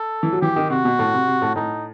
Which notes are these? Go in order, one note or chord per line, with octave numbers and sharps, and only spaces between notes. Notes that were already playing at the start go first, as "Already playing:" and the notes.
Already playing: A4
E3
F#3
E3 G4
D#3
C3 F#4
B2
A2
C3
C3
A2
A2 D#4